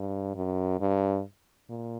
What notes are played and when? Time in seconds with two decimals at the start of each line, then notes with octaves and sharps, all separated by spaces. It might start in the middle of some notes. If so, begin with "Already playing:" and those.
Already playing: G2
0.35 F#2
0.80 G2
1.69 A#2